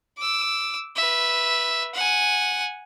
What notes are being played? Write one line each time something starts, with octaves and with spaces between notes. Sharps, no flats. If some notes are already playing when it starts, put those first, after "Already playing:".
D6 E6
B4 E5
F#5 G#5